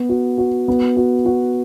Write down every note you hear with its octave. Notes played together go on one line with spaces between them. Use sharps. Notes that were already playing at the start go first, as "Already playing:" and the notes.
Already playing: B3
F#4
F#4
B3
F#4
F#4